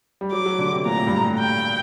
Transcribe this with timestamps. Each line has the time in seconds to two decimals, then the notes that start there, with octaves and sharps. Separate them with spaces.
0.21 G3
0.32 F#3 D6
0.46 F#3
0.59 D3
0.73 C3
0.86 A#2 A#5
0.97 A2
1.07 G2
1.17 A2
1.39 G5